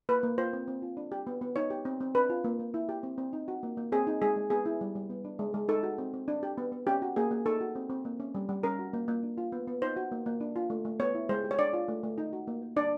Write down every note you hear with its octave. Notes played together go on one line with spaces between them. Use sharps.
A#3 B4
A#3
F4 C5
C4
C4
F4
D4
G4
B3
B3
D#4 C#5
G4
C4
C4
D4 B4
F4
A#3
A#3
E4
G4
C4
C4
D#4
F#4
A#3
A#3
C4 G#4
D#4
G#3 G#4
G#3
B3 G#4
E4
G3
G3
B3
D4
G#3
G#3
D#4 A4
F#4
C4
C4
D4
G4
B3
B3
C#4 G4
F#4
A#3 G#4
A#3
D#4 A4
F#4
C4
C4
A#3
C#4
G3
G3
C#4 A#4
F#4
A#3
A#3
D4
F4
B3
B3
D#4 C5
F#4
A#3
A#3
D4
F4
A3
A3
B3 C#5
E4
G#3 C5
G4
C#5
D4 D5
F4
A3
A3
D#4
F#4
A#3
A#3
D4 D5